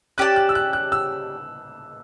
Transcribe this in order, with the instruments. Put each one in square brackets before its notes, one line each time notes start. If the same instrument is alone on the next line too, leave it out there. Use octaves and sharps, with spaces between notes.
[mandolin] C#4 G4 D5 A5 [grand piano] F#6
[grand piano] F#6
E6
F#6
F#6
E6